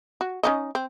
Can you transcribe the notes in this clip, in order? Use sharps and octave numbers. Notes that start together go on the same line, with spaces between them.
F#4
C#4 D#4 D#5
C4